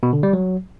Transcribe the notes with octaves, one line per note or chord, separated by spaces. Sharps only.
B2
D3
G3
F#3